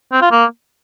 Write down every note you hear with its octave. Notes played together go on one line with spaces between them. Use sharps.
C4
F4
A#3